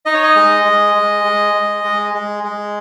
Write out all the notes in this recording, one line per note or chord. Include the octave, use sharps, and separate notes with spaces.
D#4 D#5
C#5
D#5
G#3
G#3
G#3
G#3
G#3
G#3
G#3
G#3